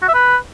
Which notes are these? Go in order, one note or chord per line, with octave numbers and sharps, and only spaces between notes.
F#4
E5
B4